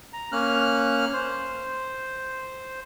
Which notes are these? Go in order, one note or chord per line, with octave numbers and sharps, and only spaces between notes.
A#5
A#3 C#4 F6 F#6
C5